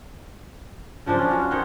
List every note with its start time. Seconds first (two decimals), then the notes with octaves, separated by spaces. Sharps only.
1.06 C#3 F3 D4 C5
1.19 C#4 D4
1.31 F4 F#4
1.51 D#3 B3 C5 C#5